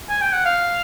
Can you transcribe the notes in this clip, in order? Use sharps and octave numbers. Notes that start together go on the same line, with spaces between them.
G#5
G5
F#5
F5